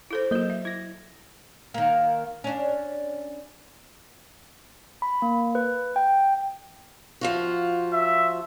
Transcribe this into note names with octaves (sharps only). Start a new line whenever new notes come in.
E4 A4 C5
F#3 A#3 F#4 D#5 G6
E5
E4 G#6 A#6
D#3 A#3
C#4 D4
B5
A#3
B4
G5
F3 F4 F#4
E5